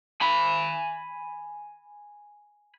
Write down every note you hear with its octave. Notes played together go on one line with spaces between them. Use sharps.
G#5 B5